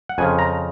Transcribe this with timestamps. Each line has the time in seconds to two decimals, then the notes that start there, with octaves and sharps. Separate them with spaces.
0.09 F#5
0.18 F2 C#3 F3 G#5
0.39 A#5